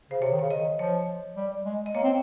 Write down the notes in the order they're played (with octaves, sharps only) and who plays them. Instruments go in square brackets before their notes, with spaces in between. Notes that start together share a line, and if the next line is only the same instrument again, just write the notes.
[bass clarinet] C#3 [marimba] C5
[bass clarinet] C3 [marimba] C#5
[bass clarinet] D#3
[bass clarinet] C#3 [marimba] C#5
[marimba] D#5
[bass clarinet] D#3
[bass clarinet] F3 [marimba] C#5
[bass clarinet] G3
G#3
[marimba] D#5
[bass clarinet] A#3 [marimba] C#5
[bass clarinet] C4